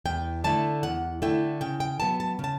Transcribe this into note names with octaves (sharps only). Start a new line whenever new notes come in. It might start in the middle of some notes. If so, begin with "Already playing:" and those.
E2 G5
D3 A3 E4 A5
E2 F#5
D3 A3 E4 G5
C#3 G5
G5
F#3 B3 A5
A5
C#3 A5